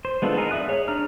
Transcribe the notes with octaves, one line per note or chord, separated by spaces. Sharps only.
C5
G#3 B3 D4 F4 A4
D#4 G#4 A#4
D5 E5 D#6 F#6
G#4 C#5
D4 A#5 F6